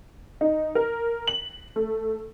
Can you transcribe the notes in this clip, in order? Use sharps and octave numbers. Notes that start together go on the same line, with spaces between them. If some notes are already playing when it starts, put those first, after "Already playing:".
D#4
A#4
F#7
A3